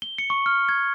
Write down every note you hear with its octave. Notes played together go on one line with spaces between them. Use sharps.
G7
C#7
C#6
F6
G#6